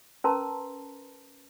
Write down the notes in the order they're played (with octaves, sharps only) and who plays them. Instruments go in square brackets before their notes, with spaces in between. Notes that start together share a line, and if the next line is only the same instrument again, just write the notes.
[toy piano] C#4 A#4 B4 A5 A#5 C6